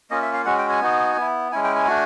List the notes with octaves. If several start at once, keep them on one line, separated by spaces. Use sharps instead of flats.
A#3 C#4 F4 D#5
E5
F5
G#3 C#4 F#4 F#5
G5
G#5
B3 D#4 F#4
B3 E4
G#3 C#4 E4 G#5
G5
G#5
A3 D4 F#4